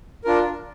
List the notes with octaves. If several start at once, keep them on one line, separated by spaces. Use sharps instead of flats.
D4 F4 A#4